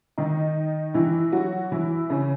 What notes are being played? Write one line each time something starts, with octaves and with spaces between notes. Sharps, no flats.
D#3 D#4
E3 E4
F#3 F#4
E3 E4
C#3 C#4